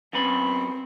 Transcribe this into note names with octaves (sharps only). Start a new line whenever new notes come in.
F#2 B3 C4 B5